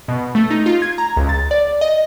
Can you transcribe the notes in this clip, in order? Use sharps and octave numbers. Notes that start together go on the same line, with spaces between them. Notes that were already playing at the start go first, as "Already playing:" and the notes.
B2
A3
D#4
F4
G#6
A#5
C#2
A6
D5
D#5